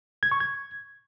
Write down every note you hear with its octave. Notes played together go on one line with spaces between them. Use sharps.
G#6
C#6
G#6